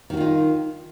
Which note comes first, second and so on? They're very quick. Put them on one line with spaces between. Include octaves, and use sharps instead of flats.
D#3 F#4 F4 D#4